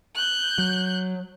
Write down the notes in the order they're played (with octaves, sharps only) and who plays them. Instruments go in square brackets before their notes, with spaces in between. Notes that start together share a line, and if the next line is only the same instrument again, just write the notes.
[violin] F#6 G6
[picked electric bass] F#3